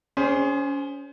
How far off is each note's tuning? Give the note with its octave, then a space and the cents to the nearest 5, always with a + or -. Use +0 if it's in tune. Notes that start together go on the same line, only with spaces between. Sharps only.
C#4 +30 G#4 -10 C5 +0